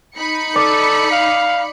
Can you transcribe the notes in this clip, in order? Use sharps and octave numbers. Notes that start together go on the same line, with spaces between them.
D#4 B5 C#7
A4 D5
F5